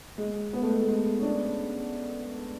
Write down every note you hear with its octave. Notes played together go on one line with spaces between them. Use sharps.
G#3
B3
A3
G#3
A3
G#3
C#4
D4